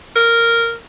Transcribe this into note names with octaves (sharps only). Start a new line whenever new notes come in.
A#4